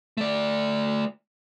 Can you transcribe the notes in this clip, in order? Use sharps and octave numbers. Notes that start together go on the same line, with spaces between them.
A3 D5